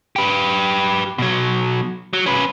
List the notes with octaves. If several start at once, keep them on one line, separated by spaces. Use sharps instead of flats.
G4 B4
B2 F#3
F#3
C#4 B4